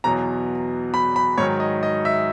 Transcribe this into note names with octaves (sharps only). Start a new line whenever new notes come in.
E2 B2 F#3 A#5
B5
B5
G#2 D#3 F#3 C#5
D#5
D#5
E5